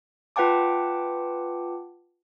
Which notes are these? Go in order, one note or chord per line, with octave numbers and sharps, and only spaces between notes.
F4 B4 F#5 G5 A5 D6